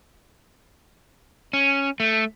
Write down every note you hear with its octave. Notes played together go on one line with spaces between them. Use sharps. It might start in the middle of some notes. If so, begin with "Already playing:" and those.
C#4
A3